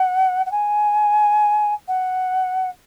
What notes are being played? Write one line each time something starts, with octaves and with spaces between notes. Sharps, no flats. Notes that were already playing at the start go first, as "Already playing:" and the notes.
Already playing: F#5
F#5
G#5
F#5